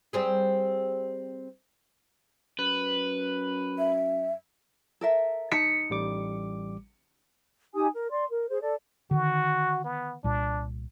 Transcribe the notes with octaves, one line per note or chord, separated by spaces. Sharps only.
G3 C4 G#4
F#2 B4
E5
A4 A#4 E5
D#4 A5 B6 C#7
A1 G3 D6
D#4 G4 G#5 D#6
A#4
D5 C6
A#4
G#4 C5
A4 D5
D3 D#3 F#4
B3
C2 A#2 D4